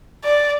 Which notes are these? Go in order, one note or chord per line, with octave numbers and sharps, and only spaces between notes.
D5